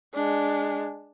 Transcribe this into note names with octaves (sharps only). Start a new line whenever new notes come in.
G#3 D4